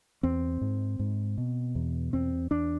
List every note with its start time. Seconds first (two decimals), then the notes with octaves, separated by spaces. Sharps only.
0.23 E2 C4
0.61 G#2
1.00 G#2
1.38 B2
1.75 E2
2.13 E2 C4
2.51 E2 D4